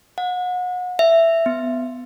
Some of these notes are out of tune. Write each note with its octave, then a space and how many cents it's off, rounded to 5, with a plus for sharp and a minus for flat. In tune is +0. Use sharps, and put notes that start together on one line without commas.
F#5 -35
E5 +10
B3 +20